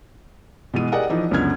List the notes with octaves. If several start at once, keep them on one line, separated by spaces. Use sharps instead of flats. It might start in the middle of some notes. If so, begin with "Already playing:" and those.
B2 E3 G#3 D#7
G4 G#4 A#4 D5 D#5 F#5
E3 F3 D#4
C#2 F#2 D3 B3 F6 G#6